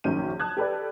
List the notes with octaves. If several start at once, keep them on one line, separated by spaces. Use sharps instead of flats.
A#1 F#2 D#3 C#4 G6 D#7
A5 D#6 F#6 G#6
G4 A4 B4 D5